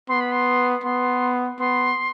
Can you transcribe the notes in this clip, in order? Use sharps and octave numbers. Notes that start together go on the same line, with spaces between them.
B3 C6
B5
C6
B3 C6
B3 C6